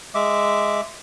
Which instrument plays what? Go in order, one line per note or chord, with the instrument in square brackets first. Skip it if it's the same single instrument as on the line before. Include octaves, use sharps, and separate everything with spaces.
[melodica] G#3 E5 D6